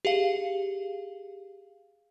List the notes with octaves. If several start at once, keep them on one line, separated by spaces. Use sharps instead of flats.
G4 G#4 F5